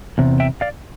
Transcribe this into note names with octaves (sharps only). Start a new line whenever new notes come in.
E2 C3
E5 G5
D5 F5